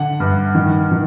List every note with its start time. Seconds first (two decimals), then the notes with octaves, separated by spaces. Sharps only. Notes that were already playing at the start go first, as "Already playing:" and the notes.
Already playing: D3 F#5
0.20 G2
0.55 D#3
0.91 D#3